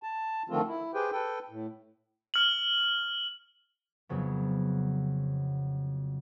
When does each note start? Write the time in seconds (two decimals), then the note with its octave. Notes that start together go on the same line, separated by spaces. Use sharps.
0.03 A5
0.49 D3 D#3 F3 A3 C4 F4
0.68 E4
0.94 G4 G#4 B4 C5 G5
1.12 A4 B4 G5
1.50 A2
2.34 F6 F#7
4.09 F2 C#3 F#3 B3